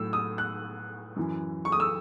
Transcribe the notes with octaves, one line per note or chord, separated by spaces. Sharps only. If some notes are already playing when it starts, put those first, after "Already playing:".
Already playing: A2 F#3 E6
D#6
F#6
F#2 E3
C#6
D#6
E6